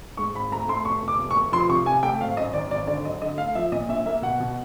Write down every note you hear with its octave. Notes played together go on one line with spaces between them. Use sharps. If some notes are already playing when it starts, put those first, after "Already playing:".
G#2 C#6
G#1 B5
A3 A#5
A3 C6
F1 C#6
F1 D6
F1
C#6
F1
F3 C6
C3 C#6
C3 G#5
A3 G5
G#1 F5
F#2 D#5
D#3 D5
G#1 D5
D3 D5
F#3 D#5
D3 D#5
A3 F5
F3 E5
A#2 D#5
A#1 E5
A#3 E5
B2 F#5
B2